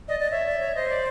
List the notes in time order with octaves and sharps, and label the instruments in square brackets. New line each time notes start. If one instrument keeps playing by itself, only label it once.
[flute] D5 [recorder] D#5
[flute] D5
[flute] C#5 [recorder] E5
[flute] D5
C#5
[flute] C5 [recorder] D#5
[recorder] D5